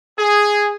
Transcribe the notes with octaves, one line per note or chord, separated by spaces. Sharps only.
G#4